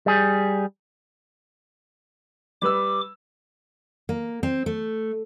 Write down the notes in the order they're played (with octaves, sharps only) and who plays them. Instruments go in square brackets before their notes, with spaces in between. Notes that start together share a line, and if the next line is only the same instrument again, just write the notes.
[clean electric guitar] G3 G#4
[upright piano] G3 B4 E6 [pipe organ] D6
[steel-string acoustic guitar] A#3
C4
A3